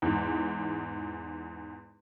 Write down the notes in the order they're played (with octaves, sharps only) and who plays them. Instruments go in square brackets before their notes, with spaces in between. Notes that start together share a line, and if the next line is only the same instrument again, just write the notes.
[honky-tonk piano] E2 G#2